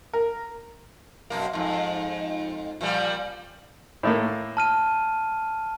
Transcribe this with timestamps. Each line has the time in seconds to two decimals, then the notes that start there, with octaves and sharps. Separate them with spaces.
0.13 A#4
1.30 F#2 B2 A#3
1.53 F2 G#2
2.81 A#2 F3 G3
4.03 A2 A3 A#3
4.57 A5 F6 D#7